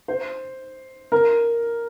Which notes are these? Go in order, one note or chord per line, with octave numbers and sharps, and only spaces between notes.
C5
A#4